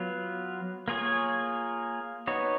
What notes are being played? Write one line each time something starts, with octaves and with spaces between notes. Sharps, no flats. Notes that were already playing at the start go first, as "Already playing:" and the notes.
Already playing: F#3 B3 F4 B4
A#3 F4 G#4 C#5
B3 D#4 F#4 C#5